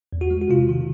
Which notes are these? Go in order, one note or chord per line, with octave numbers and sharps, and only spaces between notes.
E2
F#4
G#3
F#4
C3 F4
D#3